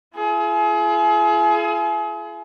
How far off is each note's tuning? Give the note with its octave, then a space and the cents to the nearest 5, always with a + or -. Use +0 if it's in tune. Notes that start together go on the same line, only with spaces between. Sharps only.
F4 -45 G#4 +35